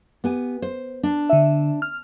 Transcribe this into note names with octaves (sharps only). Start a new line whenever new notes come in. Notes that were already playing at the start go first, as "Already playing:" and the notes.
B3 G4 G#5
C5
D4
D3 E5
F6